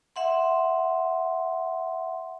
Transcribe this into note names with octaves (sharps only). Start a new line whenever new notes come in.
E5 F#5 C6